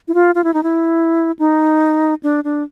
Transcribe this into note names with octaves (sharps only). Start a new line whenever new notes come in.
E4
F4
F4
E4
D#4
E4
D#4
D4
D4